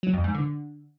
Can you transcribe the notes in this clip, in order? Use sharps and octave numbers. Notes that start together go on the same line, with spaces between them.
F#3
F2
G#2
D3